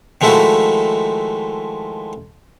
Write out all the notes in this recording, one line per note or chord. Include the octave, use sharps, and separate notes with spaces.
D#3 F3 G#3 A3 E4 F#4